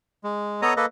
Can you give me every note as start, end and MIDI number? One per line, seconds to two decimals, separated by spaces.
0.24 0.61 56
0.62 0.74 59
0.62 0.74 69
0.62 0.74 73
0.62 0.74 75
0.62 0.74 82
0.62 0.74 87
0.77 0.86 58
0.77 0.86 69
0.77 0.86 71
0.77 0.86 75